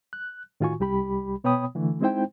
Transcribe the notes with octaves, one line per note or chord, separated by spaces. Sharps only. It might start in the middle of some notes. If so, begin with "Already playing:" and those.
F#6
A2 D#3 F4 F#4 G#5 C#6
C2 G3 G4 B5
B2 B3 C#5 G5 B5 D#6
D3 E3 A3
G#3 C4 D#4 E4 C5 G5